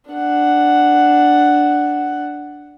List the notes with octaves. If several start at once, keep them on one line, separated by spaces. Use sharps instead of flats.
D4 F#5